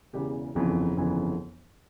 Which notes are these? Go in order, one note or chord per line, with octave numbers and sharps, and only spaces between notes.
E1 E2 C#3 E3 G4
G1 F2 C#3 E3
G1 F2 C#3 E3